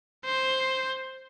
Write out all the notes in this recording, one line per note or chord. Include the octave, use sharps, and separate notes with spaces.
C5